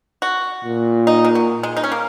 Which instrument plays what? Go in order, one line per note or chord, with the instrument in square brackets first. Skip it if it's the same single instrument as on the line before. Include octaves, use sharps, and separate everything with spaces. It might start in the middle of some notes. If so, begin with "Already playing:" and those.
[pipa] F#4
[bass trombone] A#2
[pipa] D#4
G#3
F#3
G#3
D#4
C#4
A#3